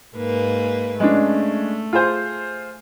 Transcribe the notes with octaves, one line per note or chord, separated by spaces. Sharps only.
G#2 A#3 B4
G#3 A3 C#4 D4
F4 G#4 C5